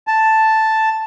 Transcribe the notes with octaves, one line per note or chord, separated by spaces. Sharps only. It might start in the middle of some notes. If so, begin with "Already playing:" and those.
A5